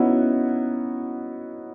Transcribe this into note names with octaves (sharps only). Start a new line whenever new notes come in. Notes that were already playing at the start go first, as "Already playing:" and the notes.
Already playing: B3 C#4 D#4 E4 F#4